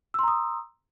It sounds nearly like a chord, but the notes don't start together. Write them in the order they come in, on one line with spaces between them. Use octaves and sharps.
E6 C6 A#5 D#6